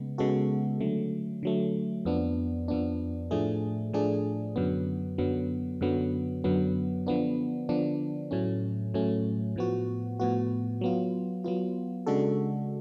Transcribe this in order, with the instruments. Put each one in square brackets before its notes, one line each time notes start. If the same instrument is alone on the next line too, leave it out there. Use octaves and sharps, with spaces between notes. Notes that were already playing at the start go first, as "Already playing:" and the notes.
Already playing: [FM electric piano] C#3 G#3 B3
C#3 G#3 B3 F#4 A4
D3 F#3 A3
D3 F#3 A3
F2 F3 B3 D4
F2 F3 B3 D4
A2 F3 A3 D4 G#4
A2 F3 A3 D4 G#4
F#2 D3 F#3 B3
F#2 D3 F#3 B3
F#2 D3 F#3 B3
F#2 D3 F#3 B3
D3 F3 B3 D4
D3 F3 B3 D4
A2 F#3 A3 C#4
A2 F#3 A3 C#4
A2 F3 B3 F#4
A2 F3 B3 F#4
F#3 B3 F4
F#3 B3 F4
C#3 G#3 D4 F#4 A4